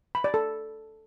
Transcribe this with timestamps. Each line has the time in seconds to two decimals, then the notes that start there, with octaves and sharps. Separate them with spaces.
0.15 B5
0.24 D5
0.34 A4